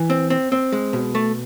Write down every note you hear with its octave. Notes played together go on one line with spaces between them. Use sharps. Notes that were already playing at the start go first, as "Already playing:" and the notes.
Already playing: E3
C4
C4
C4
G#3
B2
A3